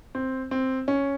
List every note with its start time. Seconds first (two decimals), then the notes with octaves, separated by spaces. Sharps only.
0.15 C4
0.51 C4
0.88 C#4